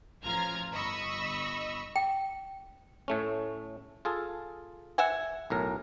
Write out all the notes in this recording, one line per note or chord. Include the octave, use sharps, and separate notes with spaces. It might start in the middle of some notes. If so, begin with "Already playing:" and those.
A1 F3 F4 A#5 F6 G#6
G1 D#5 B5 C#6 E6
G5
A2 A3 C#4
F4 G#4 A4
E5 F#5 G#5
B1 A2 A#4